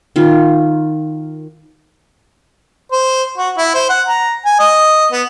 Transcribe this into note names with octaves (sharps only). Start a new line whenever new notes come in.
D#3 F4
C5
F#4
E4
C5
F#5
A#5
G#5
D#5
B3